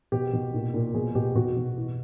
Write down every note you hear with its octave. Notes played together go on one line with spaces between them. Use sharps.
B2 G4
B2
A#2
A#2
B2 G#4
B2 G4
B2 F#4
B2
E3